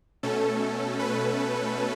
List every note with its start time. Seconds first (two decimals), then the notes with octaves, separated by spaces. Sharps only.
0.23 B2 A3 C#4 A4
0.99 B4